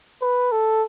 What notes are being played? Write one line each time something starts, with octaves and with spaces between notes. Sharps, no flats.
B4
A4